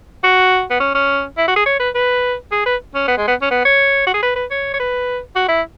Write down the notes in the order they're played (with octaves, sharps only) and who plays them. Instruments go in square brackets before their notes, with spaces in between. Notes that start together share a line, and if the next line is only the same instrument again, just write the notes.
[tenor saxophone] F#4
B3
C#4
C#4
E4
F#4
G#4
C#5
B4
B4
G#4
B4
C#4
B3
G#3
B3
C#4
B3
C#5
F#4
G#4
B4
B4
C#5
C#5
B4
F#4
E4